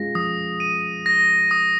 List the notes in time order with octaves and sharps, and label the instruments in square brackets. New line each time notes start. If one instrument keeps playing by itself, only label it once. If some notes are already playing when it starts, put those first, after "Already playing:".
Already playing: [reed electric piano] G#3 C#4 F4 G#4 [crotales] A#6
[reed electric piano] F3 [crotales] D#6
[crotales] D#7
A#6
D#6